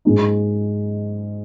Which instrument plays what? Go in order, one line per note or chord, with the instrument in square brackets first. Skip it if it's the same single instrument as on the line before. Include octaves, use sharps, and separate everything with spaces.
[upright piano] G#2 G#3 D#4